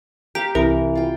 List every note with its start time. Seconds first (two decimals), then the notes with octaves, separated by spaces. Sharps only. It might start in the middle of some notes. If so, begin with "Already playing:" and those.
0.35 G4 A#4 F5
0.55 C2 E3 A#4
0.95 F4 G5